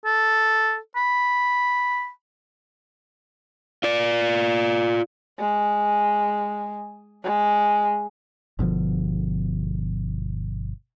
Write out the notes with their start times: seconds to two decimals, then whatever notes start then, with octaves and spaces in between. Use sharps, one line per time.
0.05 A4
0.96 B5
3.84 F4 D5
5.39 G#3
7.24 G#3
8.59 G1 B2 D3 F3